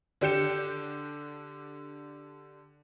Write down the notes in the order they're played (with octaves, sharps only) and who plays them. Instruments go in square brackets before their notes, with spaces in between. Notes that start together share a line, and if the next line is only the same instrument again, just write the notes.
[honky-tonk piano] D3 D4 G4 G6 C#7 E7